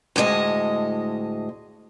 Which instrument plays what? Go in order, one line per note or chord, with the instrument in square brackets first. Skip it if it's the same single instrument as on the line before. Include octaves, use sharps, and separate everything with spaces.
[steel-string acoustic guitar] D2 A2 G#3 D#5